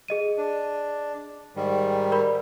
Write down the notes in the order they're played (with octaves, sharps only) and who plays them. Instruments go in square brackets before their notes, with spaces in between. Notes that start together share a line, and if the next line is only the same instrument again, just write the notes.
[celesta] G#4 D#5 D#7
[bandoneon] D4
G#2 D#3 G3
[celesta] A#4 D5 B5